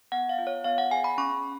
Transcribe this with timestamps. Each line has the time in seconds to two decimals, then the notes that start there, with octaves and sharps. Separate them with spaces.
0.12 B3 F#5
0.29 F5
0.39 F4
0.47 C#5
0.64 B3 F5
0.78 F#5
0.91 G#4 G#5
1.04 B5
1.18 C#4 C#6